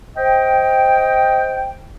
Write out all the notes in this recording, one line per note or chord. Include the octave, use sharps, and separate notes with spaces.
C5 D#5 G5